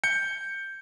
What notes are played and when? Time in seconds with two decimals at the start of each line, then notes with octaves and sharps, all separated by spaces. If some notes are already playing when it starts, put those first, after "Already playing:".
0.04 G6 C#7